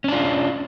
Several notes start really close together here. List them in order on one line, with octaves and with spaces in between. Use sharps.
C#4 D4 F4